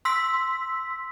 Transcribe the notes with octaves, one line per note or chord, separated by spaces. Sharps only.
C6 E6 B6